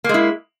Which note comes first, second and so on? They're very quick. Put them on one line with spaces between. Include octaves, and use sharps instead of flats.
A#3 G#3 E4